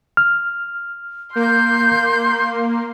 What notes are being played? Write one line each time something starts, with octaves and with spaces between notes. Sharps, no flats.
F6
A#3 C6 G6